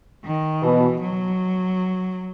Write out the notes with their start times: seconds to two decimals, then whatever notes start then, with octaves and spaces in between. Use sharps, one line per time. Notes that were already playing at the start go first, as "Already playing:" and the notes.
0.24 D#3
0.63 B2 E3
1.01 F#3